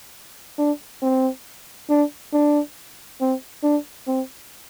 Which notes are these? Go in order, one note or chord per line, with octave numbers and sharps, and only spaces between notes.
D4
C4
D4
D4
C4
D4
C4